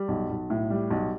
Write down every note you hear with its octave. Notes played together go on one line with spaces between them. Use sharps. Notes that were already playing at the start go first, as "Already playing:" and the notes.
Already playing: G3
B1
B1
A2
G3
B1